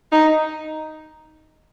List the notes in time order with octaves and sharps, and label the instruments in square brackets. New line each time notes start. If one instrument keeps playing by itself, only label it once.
[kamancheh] D#4